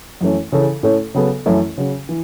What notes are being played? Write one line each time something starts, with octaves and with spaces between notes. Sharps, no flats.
F#2 E3 A3 C#4
C#3 E3 C#4 A4
A2 A3 C#4 A4 C#5
C#3 F#3 B3 A4
F#2 E3 A3 C#4 E4
C#3 F#3 C#4
E3